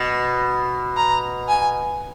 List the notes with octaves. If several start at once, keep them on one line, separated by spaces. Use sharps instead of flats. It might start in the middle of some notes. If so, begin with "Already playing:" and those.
Already playing: B2
A#5
G#5